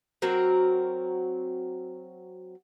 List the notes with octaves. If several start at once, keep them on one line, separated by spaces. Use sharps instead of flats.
F#3 C4 F#4 A#4